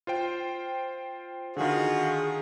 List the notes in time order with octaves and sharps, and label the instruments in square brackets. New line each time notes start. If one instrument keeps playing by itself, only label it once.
[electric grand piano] F4 C5 G5
[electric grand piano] D3 D#3 [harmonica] F4 F#4 [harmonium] G#4